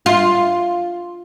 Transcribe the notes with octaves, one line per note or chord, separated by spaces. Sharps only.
F4